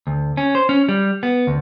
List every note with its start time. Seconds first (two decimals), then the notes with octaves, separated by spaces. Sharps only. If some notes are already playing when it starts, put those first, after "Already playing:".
0.07 D2
0.37 C#4
0.55 C5
0.69 C#4
0.89 G3
1.23 B3
1.47 D2